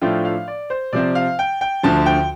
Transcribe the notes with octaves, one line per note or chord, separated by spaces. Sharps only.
A2 F3 A3 D4 F4 G5
F5
D5
C5
C3 F3 C4 D5
F5
G5
G5
D2 D3 F3 A5
G5